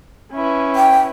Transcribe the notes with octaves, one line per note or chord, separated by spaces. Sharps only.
C#4 E4 B4
G5